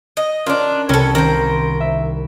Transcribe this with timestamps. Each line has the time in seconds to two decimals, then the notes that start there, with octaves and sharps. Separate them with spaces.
0.17 D#5
0.46 C#4 D4 F4 A#4
0.89 C2 C#4 A4 A#4 C#7
1.15 D#3 A#4 C5
1.80 E5